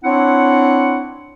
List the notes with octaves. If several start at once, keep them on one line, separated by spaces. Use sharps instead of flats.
C4 D4 E4 C#5 F#5